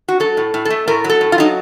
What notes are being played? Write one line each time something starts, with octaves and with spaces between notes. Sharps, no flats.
F#4
F#3 A4
A2
A2
A4
A3
A2 A#4
F#3
A4
A2
F4
F#3 D#4